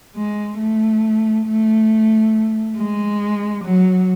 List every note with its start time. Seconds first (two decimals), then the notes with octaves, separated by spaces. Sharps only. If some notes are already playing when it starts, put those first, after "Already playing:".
0.16 G#3
0.59 A3
1.46 A3
2.77 G#3
3.64 F#3